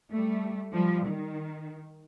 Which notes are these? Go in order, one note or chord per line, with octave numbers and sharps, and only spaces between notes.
G3 A3
F3 G3
D#3